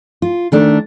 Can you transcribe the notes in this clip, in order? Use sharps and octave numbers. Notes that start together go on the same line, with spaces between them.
F4
D#3 A3 D4